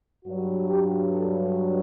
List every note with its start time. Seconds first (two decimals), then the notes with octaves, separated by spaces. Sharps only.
0.25 G2 F#3 F#4
0.68 G4
1.11 A4